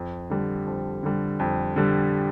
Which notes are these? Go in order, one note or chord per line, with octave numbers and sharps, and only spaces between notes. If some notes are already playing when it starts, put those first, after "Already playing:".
Already playing: F2
D3 G3
F2
D3 G3
F2
D3 G3